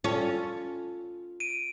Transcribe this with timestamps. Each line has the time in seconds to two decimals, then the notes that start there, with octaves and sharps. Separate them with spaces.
0.04 C#4 F4 A4
1.40 D7 D#7